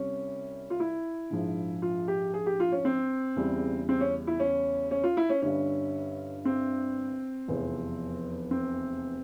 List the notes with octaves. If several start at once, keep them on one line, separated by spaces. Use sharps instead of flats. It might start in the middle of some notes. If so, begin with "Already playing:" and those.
Already playing: C2 C3 G3 C#4
F4
E4
A#1 G#2 F3
F4
G4
G#4
G4
F4
C#4
C4
E2 C#3 G3
C4
C#4
E4
C#4
C#4
F4
E4
C#4
G1 G2 G3 C#4
C4
F1 E2 C3 F3
C4